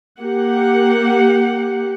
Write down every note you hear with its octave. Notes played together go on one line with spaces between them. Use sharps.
A#3 G4 F#5